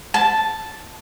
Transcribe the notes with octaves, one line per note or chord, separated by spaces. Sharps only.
A5